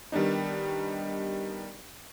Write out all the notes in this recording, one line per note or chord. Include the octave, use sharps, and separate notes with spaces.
D#3 G3 B3 D4 D#4